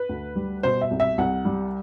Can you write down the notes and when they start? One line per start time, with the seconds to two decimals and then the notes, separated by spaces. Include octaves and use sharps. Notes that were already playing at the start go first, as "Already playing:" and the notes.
Already playing: B4
0.09 D2
0.36 G3
0.63 B2 C5
0.81 E5
0.91 C2
1.00 E5
1.18 C2 F#5
1.45 G3